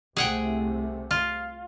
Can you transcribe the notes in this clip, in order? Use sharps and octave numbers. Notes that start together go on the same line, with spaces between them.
C2 C3 A3 G#4 F#5 G5
F4